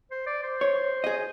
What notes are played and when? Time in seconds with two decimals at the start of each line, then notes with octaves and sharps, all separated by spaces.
0.11 C5
0.27 D5
0.43 C5
0.61 C#5
1.04 G#4 D#5